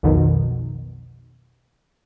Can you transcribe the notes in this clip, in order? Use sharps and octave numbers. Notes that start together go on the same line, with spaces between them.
B1 F2 B2 D#3